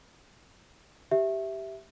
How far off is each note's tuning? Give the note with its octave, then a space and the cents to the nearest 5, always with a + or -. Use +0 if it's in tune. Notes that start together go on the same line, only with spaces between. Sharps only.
G4 -5 E5 +0